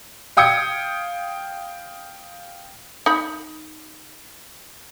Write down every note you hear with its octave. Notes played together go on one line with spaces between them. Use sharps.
F5 G5 D#6 G#6 C#7
D#4 B5